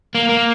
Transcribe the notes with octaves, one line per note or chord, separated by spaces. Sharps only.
A#3
A#3